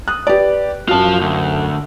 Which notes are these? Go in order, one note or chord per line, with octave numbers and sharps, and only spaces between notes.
D#6 F#6
G4 B4 D5
F#2 F4 F#4 A5
D2